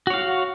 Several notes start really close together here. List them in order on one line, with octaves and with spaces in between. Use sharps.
F#4 C#5 F5